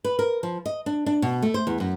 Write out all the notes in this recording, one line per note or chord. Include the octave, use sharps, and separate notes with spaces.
B4
A#4
F3
D#5
D4
D4
B2
A3
C5
E2
F#2